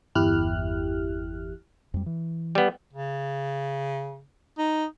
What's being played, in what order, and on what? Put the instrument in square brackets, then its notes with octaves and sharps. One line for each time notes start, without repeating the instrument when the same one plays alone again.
[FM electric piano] G1 E2 E4 G4 F6 F#6
[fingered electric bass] F2 G3
E3
[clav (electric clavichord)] G3 B3
[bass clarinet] C#3
D#4